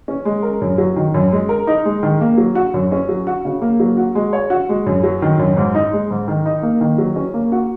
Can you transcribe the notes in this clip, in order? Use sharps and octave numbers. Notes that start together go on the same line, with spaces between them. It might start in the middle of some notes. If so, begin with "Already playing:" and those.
C#4
G#3
A#4
F#2
F#3
D#3
F#2
G#3
A#4
D#4
G#3
D#3
A#3
F#3
F#4
F#2
C#4
F#3
F#4
C#3
A#3
F#3
F#4
G#3
C#5
F#4
G#3
F#2
F#3
D#3
F#2
G#2
D#4
G#3
G#2
D#3
D#4
A#3
D#3
F#3
C#4
A#3
F#4